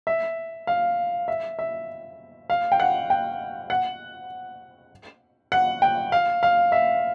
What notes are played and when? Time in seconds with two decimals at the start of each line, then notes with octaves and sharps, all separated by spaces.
0.07 E5
0.67 F5
1.28 E5
1.59 E5
2.50 F5
2.72 G5
2.80 F#5
3.10 G5
3.70 F#5
5.52 F#5
5.82 G5
6.12 F5
6.43 F5
6.72 E5